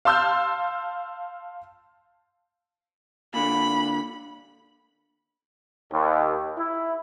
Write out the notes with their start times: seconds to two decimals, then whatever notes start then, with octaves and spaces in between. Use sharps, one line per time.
0.05 F5 A5 C6 E6 F6 G6
3.34 A#2 D3 B5
5.91 D#2
6.57 E4